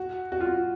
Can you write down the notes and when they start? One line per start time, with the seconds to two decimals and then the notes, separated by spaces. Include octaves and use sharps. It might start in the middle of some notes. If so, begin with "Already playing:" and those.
Already playing: F#4
0.32 F#4
0.41 F4